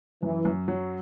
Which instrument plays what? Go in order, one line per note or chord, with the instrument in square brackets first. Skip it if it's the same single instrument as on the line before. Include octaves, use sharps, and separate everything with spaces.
[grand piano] F#2 [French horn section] E3
[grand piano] F#2
F#3